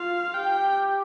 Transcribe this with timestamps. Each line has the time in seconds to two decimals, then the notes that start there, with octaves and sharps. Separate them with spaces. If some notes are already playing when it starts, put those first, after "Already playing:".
Already playing: F4 F5
0.34 G4 G5